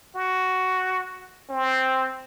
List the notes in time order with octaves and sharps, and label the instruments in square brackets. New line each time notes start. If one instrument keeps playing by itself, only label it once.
[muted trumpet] F#4
C4